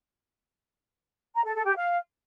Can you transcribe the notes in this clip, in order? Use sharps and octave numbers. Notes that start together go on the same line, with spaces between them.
A#5
A4
A4
G4
F5